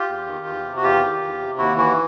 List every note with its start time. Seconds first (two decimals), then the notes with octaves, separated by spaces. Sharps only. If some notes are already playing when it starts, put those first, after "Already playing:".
Already playing: F4 G4
0.08 E2
0.27 D#3
0.46 E2
0.64 C3
0.76 F#4
0.83 E2 F4 G4
1.03 D#3
1.22 E2
1.40 C3
1.58 D#2 E4 F#4
1.77 E3 E4 F#4